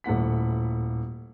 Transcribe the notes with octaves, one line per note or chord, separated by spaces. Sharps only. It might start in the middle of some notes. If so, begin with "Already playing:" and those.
D#1 A2 F#5 B6